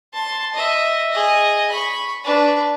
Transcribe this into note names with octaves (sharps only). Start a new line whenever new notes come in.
A5 C6
D#5 E5
G#4 D#5
B5 C#6
D4 B4